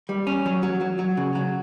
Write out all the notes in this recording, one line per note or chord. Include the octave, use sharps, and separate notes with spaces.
G3
C#4
F#3
F#3
F#3
F#3
C#3
F#3